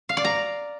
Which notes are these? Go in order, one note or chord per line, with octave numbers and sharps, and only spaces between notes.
F5
D5
A#5